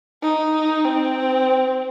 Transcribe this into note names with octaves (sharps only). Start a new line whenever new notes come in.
D#4
C4